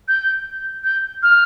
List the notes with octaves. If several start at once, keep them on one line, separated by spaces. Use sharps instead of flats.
G6
G6
F6